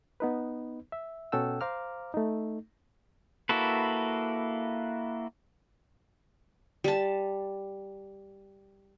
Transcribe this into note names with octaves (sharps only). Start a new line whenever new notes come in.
B3 D#4 B4
E5
B2 C#4 A4 F#5 G5 E6
C5 F5 A#5 D6 F6
A3 D#4
A#3 E4 F#4 A4 B4
G3 A5